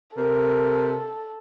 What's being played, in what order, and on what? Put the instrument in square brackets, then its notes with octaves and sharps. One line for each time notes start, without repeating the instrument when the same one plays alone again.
[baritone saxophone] C3 [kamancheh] A4 [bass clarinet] A#4